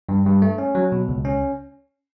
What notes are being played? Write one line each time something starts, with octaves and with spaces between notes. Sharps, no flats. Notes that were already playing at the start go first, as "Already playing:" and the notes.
G2
G2
A3
C#4
F#3
B2
C#2
C#4